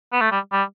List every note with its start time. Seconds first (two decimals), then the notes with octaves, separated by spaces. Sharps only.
0.13 B3
0.21 A3
0.32 G3
0.52 G3